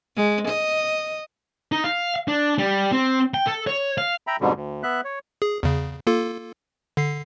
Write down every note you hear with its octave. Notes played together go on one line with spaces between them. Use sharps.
G#3
D#5
D#4
F5
D4
G3
C4
G5
A4
C#5
F5
E5 G5 A#5 B5
F2 G#2 B2 D3 G3
D2
B3 E5 F#6
C#5
G#4
E2 C#3
A#3 F4 A4
D3 C7